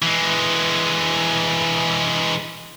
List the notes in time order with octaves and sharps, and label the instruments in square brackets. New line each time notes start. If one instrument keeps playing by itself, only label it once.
[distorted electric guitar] E3 G#3